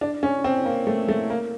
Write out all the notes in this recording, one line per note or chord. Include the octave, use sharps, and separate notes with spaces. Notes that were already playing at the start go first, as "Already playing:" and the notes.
D4
C#4
C4
A#3
A3
A3
A#3